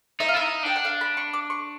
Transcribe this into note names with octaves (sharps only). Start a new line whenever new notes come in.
D#4 E5
F5
E4
D#4 E5
D4 G5
F#5
F5
B5
C#6
D6
C#6